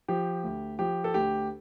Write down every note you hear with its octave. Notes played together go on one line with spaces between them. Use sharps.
F3 G4
D2
F3 G4
A4
D2 G4